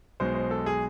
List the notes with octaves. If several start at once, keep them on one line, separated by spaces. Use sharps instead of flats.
B1 B2 G#3 C5
C5
A4
G#4